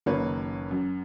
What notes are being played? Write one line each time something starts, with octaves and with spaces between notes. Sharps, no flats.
F#1 D#3 A#3 B4 C#5
F#2